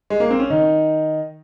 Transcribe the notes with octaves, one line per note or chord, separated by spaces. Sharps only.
G#3
A#3
C4
C#4
D#3 D#4